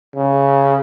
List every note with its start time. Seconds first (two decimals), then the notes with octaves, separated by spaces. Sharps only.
0.16 C#3